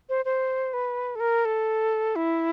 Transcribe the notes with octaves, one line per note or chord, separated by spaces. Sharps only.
C5
C5
B4
A4
A#4
A4
E4